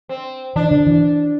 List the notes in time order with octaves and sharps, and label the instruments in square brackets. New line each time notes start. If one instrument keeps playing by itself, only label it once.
[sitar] C4
[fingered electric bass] E3 [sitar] D4
[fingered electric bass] D3
E3